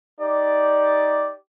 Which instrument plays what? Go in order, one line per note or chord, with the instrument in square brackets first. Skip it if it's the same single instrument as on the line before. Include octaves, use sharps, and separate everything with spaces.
[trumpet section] D#4 G4 D5